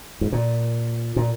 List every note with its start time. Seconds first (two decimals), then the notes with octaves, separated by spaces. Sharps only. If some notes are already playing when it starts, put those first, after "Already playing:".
0.21 G#2
0.32 A#2
1.16 A#2